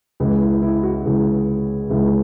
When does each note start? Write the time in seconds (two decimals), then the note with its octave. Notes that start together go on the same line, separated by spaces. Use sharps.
0.20 C#2 C#3 E3 E4
0.41 E4
0.62 E4
0.83 F#4
1.05 C#2 C#3 E3
1.89 C#2 C#3 E3 E4